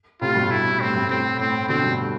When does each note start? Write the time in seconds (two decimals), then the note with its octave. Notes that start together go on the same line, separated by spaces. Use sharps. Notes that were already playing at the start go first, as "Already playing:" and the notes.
0.21 A2 C3 F4
0.36 G2 B2
0.51 E4
0.70 B2
0.81 A2 C4
0.95 G2
1.10 A2 C4
1.39 A2 C4
1.69 B2 D3 C4
1.84 G2 B2